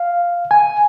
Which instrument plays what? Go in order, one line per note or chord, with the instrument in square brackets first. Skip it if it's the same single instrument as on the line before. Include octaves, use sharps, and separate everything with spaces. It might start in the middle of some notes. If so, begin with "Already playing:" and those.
Already playing: [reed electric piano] F5
G#5